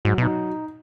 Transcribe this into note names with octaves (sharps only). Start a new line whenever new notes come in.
G#2 F#3
B2 D#4